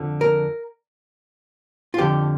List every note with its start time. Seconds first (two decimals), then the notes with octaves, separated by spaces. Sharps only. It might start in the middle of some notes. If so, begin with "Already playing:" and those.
Already playing: F2 D3 F3
0.21 A#4
1.94 F4
1.98 F2 D3 F3 G4